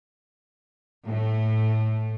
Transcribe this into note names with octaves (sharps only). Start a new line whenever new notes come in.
A2 A3